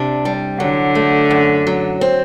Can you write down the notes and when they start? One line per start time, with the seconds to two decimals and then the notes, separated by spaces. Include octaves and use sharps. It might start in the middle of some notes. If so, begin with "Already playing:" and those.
Already playing: C3 D4
0.25 G3
0.60 D3 F#3
0.95 A3
1.31 F#2
1.67 F#3
2.01 C4